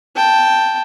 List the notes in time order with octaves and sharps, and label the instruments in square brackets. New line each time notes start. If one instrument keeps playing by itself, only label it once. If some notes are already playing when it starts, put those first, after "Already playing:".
[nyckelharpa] G5 A5